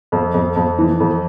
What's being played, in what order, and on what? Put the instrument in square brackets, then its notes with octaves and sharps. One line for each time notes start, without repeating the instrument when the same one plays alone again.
[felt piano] F2
F2
F2
E3
F2